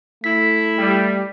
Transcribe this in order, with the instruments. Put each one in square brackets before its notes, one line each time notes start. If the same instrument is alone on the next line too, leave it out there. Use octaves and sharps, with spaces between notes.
[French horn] A3 [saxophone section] E4 [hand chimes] B6
[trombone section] G3